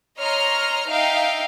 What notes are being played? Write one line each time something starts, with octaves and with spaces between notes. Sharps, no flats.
C#5 D#5 A#5 C6 F6
D#4 E5 F5 G5